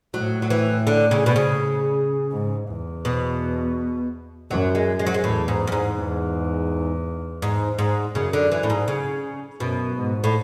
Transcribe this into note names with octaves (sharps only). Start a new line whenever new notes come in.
A2 F#3
F#3
E3
D3
C#3
B2
C#3
G#2
E2
B2
F#2 F#3
G#3
G#3
F#3
G#3
E2 A2
G#2
F#2
G#2
E2
G#2
G#2
F#2 C#3
D3
E3
A2
G#2
C#3
F#2 B2
G#2
A2